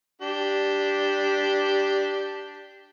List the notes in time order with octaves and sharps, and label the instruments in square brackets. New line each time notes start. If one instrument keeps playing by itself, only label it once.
[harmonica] D4 G4